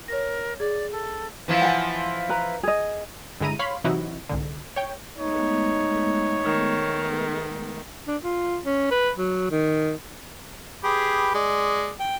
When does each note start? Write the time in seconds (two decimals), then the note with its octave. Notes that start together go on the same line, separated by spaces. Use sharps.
0.08 A#4 C#5 A#6
0.60 G#4 D5
0.92 A4
1.48 E3 F3 E4
1.62 F#5 G#5
2.29 B4 A#5
2.63 G#4 D#5
3.40 G2 D3 G#3 E4 A#5 D#7
3.59 C#5 F5 B5 C6
3.84 C3 E3 F#3 D#4 E4 F#4
4.29 C2 G#2 D3
4.76 C#5 G5
5.18 G#3 A3 B3 D#4 C#5
6.45 D#3
8.08 D4
8.23 F4
8.65 C#4
8.91 B4
9.18 F#3
9.51 D#3
10.84 G4 G#4 B4
11.34 G#3 D5
12.00 G5